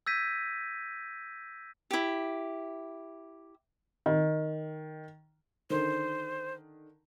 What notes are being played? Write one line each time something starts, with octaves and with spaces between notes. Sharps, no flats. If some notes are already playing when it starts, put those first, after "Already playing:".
E6 G6 G#6 A#6 B6 D#7
E4 G4
D#3
D3 D#3 C5